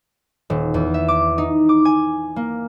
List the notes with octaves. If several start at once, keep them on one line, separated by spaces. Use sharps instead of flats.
D#1
E2
E5
D6
D#4
D6
G#5
A#3